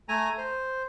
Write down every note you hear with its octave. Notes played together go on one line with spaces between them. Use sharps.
A3 G#5 A#5
C5